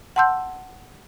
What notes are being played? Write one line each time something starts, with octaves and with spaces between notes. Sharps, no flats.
F#5 A5 C6 E6 G6